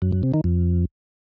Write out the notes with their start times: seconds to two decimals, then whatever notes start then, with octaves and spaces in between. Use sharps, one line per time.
0.02 F#2
0.12 F#2
0.23 C3
0.34 D#3
0.44 F2